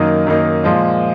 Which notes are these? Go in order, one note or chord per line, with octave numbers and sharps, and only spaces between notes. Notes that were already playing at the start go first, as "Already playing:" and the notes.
Already playing: F#2 D#3 A#3 D#4 D#6
F#2 D#3 A#3 D#4
A#2 F3 G#3